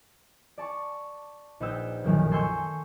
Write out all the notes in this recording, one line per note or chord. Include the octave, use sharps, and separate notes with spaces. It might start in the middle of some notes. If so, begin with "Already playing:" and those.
D5 A5 C#6
A#1 D#4 B4 G5 E6 G6
B1 F#2 A#2 D#3 F3 A3
A4 G#5 C6 C#6 E6 G6